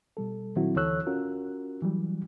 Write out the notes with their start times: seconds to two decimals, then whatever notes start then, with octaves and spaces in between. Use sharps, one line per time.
0.17 B2 G3 A4
0.56 A#2 D#3 F#3 C4 E4 F#4
0.76 D2 E3 A4 C#5 E6 F#6
1.07 C#4 F4 F#4 A#4
1.82 E3 F#3 G3